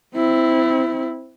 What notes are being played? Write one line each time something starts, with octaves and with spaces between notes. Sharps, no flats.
C4 E4